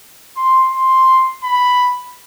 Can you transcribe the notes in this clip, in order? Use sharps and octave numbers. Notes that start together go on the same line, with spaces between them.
C6
C6
B5